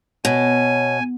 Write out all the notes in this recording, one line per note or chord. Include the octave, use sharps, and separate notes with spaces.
B2 C#5 G#5